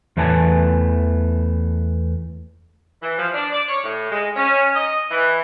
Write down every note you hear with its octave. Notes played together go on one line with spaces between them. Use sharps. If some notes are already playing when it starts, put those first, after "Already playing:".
E2 E3 A3 B4 G#5 A5
E3
F3
D4
D5
C#5
A2
G#3
C#4
D#5
E3